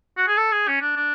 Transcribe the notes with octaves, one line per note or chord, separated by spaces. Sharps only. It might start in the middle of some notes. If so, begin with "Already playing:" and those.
F#4
G#4
A4
G#4
C#4
D4
D4